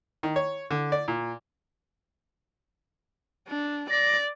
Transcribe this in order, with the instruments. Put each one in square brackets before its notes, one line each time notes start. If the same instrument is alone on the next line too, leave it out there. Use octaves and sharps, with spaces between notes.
[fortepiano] D#3
C#5
D3
D5
A#2
[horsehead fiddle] D4
[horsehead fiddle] D5 [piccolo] A#6